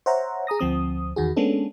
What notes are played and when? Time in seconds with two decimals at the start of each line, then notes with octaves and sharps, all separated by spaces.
0.06 C5 C#5 E5 F#5 A#5
0.47 G#4 A#5 D#6 A#6
0.59 D2 F3 C4 D#6
1.16 E2 D#3 F#4 G#4
1.36 G#3 A#3 B3 C#4 D4 A4